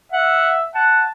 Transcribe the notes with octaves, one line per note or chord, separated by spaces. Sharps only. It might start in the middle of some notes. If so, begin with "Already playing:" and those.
E5 F#5
F#5 A5